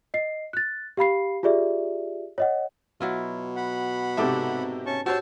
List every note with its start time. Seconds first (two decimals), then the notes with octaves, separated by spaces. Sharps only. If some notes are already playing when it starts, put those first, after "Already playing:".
0.14 D#5 C7
0.53 F#6 A6
0.97 G4 F5 B5 C7
1.43 F4 G4 G#4 D5 E5
2.38 C#5 D#5 F#5
3.01 B2 F#3 E4 F4
3.56 F#5 B5
4.17 G#2 C3 G4 A4 D5 E5
4.86 C#4 A5 C#6
5.06 F#4 G4 C5 C#5 A5 E6